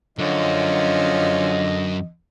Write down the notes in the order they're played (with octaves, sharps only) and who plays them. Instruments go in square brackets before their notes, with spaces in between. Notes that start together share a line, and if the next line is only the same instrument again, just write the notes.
[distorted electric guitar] F#2 [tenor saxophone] D3 [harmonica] F3 C#4 [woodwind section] D#5